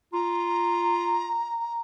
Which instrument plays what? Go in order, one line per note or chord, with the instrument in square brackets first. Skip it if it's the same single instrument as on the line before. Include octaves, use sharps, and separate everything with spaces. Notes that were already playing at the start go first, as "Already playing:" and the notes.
[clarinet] F4 [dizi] A#5